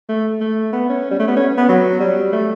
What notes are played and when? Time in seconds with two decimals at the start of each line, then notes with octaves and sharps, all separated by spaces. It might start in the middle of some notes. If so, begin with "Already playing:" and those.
0.09 A3
0.41 A3
0.73 B3
0.90 C#4
1.11 G3
1.19 A3
1.28 B3
1.37 C#4
1.58 B3
1.69 F#3
2.00 G3
2.32 A3